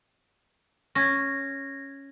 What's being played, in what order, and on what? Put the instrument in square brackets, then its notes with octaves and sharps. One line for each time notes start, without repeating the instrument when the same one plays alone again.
[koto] C#4 [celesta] G#6 A#6